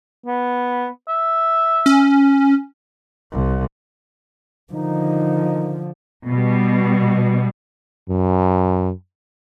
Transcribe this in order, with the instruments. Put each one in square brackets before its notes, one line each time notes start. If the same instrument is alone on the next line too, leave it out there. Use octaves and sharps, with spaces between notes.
[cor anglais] B3
E5
[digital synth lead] C#4
[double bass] C2
[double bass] D3 F3 [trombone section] D#3 D#4
[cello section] B2 G3
[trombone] F#2